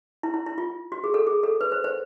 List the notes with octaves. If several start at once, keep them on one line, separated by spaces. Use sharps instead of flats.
E4
E4
E4
F4
F#4
G#4
A4
G#4
A4
B4
C5
C5